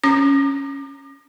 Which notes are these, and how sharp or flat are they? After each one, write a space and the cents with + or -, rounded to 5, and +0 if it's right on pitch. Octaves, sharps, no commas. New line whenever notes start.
C#4 +0 D6 +45